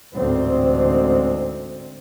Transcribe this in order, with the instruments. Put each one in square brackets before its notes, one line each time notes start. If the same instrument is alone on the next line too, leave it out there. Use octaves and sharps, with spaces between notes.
[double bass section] A1 D2 G#2 C4